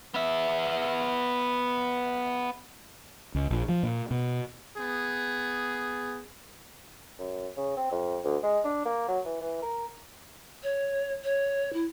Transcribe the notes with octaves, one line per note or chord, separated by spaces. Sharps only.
B3 E5
C#2
A#1
F3
A#2
B2
B3 G#4
F#2
C#3
C4
F2
D2
G#3
D4
A#3
F#3
E3
E3
A#4
C#5
C#5
E4